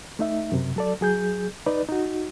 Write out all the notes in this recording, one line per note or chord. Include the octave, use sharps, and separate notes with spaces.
A3 D#4 E5
F#2 C3
F#3 A4 D5
F#3 G#4 G6
D#4 B4 D5
D#4 F#4